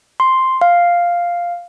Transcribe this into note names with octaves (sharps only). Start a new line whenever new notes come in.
C6
F5